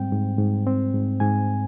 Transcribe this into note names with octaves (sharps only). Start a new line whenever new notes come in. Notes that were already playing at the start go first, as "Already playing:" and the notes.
Already playing: G#2 G3 C4 G5
G#2
G#2
C4
G#2
G#2 G#5